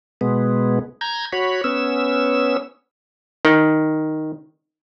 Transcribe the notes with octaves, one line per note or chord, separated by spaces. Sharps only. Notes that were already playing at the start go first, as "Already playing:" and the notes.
B2 G#3 B3
A#5 G6 G#6
F#4 C#5 B5
B3 C#4 E6
D#3